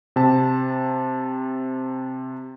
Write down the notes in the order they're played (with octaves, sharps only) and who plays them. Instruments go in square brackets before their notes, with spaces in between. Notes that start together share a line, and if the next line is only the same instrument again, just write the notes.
[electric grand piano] C3 A5